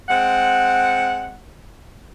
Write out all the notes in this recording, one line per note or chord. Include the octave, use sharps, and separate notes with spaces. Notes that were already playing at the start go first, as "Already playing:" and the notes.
G#3 C4 F#5